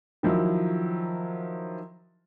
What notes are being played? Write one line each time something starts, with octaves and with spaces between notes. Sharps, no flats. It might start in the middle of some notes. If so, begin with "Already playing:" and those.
D#3 F3 F#3 E4